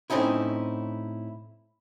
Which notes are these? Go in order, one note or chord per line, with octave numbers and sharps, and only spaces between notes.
A2 C4 C#4 D#4 E4